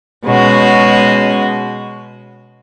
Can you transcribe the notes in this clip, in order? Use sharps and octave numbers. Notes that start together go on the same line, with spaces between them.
B2 G#3 C#4 F#4